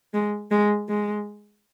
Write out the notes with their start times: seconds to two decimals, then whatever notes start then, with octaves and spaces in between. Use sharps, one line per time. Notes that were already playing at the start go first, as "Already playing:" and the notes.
0.14 G#3
0.51 G#3
0.89 G#3